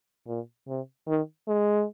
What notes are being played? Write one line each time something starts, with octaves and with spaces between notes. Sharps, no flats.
A#2
C3
D#3
G#3